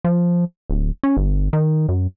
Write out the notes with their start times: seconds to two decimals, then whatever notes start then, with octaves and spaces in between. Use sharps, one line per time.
0.04 F3
0.70 D1
1.03 C#4
1.17 G1
1.53 D#3
1.89 F#2